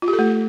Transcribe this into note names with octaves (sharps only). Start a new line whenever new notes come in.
F4
G4
A4
A3